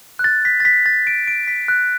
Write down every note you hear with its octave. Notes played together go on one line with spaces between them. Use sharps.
F#6
A6
B6
A6
B6
A6
D7
D7
B6
F#6